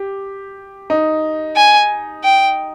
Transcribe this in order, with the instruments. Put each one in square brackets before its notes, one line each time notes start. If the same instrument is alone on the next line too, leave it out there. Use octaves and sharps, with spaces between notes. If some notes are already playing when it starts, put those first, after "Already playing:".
Already playing: [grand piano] G4
D#4
[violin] G#5
G5